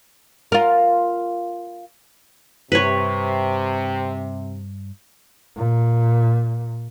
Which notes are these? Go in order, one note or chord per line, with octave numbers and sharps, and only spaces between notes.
F4 A#4
G2 C3 B4 C#5
A#2